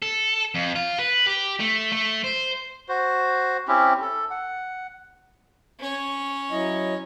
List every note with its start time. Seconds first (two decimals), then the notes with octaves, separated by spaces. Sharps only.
0.02 A4
0.55 F2
0.76 F4
0.99 B4
1.27 G4
1.60 A3
1.92 A3
2.24 C5
2.89 F#4 C5
3.68 C4 C#4 E4 G4
4.01 A4
4.31 F#5
5.79 C#4 C#5
6.51 F#3 E4 D#5